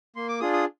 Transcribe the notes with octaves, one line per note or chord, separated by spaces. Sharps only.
A#3 C6
D6
D4 F4 G#4 D#6
D#6